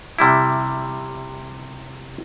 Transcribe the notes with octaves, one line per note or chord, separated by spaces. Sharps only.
C3 G3 E4